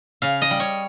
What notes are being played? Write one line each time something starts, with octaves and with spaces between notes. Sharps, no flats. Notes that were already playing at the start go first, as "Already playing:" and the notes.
C#3 F5
D#5
G3
C#5